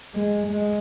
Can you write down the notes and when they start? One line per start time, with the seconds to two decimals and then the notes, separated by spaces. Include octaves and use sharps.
0.15 G#3
0.48 G#3